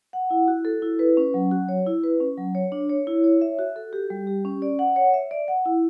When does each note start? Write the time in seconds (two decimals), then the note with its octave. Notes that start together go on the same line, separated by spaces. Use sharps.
0.13 F#5
0.30 E4
0.48 F#4
0.65 A4
0.82 E4
0.99 B4
1.17 C#4
1.34 F#3
1.51 F#4
1.69 C#5
1.86 E4
2.03 B4
2.20 C#4
2.38 F#3
2.55 C#5
2.72 D4
2.89 C#5
3.07 E4
3.24 C#5
3.41 E5
3.59 F#4
3.76 A4
3.93 G4
4.10 G3
4.27 G4
4.45 C#4
4.62 D5
4.79 F#5
4.96 C#5
5.14 E5
5.31 D5
5.48 F#5
5.65 E4